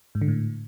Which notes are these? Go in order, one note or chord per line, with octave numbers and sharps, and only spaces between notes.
G#2
D3
A2